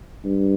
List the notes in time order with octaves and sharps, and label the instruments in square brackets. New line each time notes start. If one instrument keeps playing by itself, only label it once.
[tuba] G2